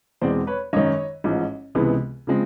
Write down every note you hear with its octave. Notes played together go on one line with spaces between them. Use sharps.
E2 B2 G#3 C4 C5 D5
B4 C#5
G#1 F#2 D#3 C#5 D#5
A1 G#2 F3
C#2 C3 E3 G#3 B3
C#3 F3 G#3 C4